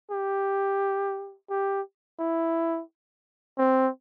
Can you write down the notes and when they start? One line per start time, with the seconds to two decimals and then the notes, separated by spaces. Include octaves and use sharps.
0.11 G4
1.50 G4
2.20 E4
3.58 C4